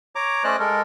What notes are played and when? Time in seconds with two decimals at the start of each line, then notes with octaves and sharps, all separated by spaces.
0.15 C#5 A#5 D6
0.44 A3 C#4 C5 D5 D#5 F#6
0.60 G#3 A4 A#4